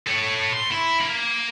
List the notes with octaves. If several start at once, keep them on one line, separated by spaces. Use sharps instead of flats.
A4 C#5
C6
E4
A#3